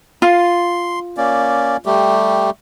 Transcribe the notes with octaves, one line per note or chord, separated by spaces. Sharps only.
F4 C6
A#3 C#4 D5
G3 A3 G4